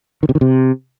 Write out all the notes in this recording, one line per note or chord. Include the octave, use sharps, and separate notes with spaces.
D#3
C3
D#3
C3